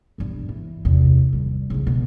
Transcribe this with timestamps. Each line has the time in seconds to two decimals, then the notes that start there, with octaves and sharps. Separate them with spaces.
0.18 B1 G2
0.49 E3
0.85 E2 C3
1.33 D#3 G3
1.70 C2 C#3
1.87 B2